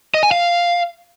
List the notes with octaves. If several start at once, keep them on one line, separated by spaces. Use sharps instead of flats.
D#5
G#5
F5